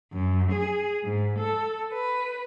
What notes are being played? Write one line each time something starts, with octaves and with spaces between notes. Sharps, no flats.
F#2
G#4
G#2
A4
B4